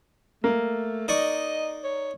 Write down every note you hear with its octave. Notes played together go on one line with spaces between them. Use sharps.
A3 A#3
D#4 D5 D#5 C#6
C#5